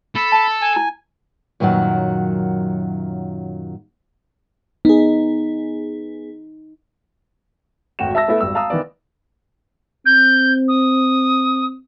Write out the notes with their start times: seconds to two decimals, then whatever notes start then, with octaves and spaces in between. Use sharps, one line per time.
0.16 A4 B5
0.32 A5
0.61 G#5
0.76 E4
1.60 F#2 A#2 D#3 F#3 F#5
4.85 B3 D#4 G#4
7.99 G#1 D2 F#4 G5 E7
8.15 E5 A5 E6 A#6
8.28 A3 B3 E4 A4 E5
8.41 G#1 G3 E6
8.55 F5 A5 A#5 D#6 E6
8.70 D#3 E3 B3 D5
10.06 C4 G6
10.68 D#6